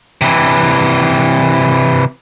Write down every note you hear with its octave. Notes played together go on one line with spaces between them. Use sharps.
C3 E3